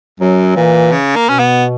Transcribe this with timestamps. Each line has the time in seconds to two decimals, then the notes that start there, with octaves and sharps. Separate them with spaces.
0.20 F#2 F#3
0.56 A#2 E3
0.92 C#3
1.16 A#3
1.28 B2 C#4
1.39 B3